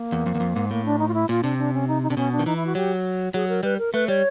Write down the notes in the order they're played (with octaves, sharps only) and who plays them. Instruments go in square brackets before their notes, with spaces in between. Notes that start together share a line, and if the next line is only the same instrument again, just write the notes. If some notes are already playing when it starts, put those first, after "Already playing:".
Already playing: [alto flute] A#3
[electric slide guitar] E2
F2
E2
F2
G#2
[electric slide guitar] A2 [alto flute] A#3
[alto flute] D4
D#4
F4
E4
[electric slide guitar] A#2 [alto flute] F4
[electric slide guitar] C3 [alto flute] D4
[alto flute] D4
C#4
D#4
D#4
[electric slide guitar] C3 [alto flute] D4
[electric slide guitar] B2 [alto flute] C#4
[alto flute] D4
[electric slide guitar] D#3
[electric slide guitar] E3 [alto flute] D#4
[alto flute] E4
F#4
[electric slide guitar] F#3 [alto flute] G4
[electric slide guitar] F#3 [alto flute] G#4
[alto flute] A#4
[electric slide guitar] G3 [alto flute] B4
[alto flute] A#4
[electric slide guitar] A3 [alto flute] B4
[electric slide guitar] G3 [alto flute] C#5